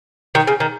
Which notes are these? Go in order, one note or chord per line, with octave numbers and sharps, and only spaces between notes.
D#3
C#3
D#3